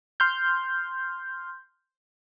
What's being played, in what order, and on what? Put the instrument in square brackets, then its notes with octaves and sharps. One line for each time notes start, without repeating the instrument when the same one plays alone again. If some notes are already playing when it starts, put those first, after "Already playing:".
[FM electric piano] C6 F6 G6